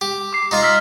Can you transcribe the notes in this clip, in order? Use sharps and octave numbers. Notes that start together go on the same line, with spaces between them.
G4
D6 C7
D#4 F4 A#5
E6 F6 B6